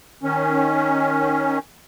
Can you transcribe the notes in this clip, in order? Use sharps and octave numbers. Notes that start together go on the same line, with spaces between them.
D#3 C#4